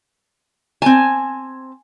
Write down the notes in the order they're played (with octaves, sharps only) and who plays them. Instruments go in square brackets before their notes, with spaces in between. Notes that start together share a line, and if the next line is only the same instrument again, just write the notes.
[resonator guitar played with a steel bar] C4 A5 [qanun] G#5